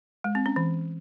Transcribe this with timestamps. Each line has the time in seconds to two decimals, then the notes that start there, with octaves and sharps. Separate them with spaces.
0.24 G#3
0.35 C4
0.46 C#4
0.56 E3